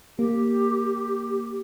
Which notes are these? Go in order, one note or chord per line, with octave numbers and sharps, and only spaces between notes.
A#3 G4